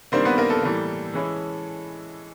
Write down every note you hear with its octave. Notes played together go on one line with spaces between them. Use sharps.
D#3 G3 A#3 C4 D4 C5
B3 B4
A#3 A#4
A4
A2 E3 G3 A#3
E3 G#3 C#4 E4